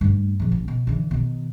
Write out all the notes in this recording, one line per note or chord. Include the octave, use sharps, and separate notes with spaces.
G2 A3
B2 F3
A1
B2
D3 E3
B2 D#3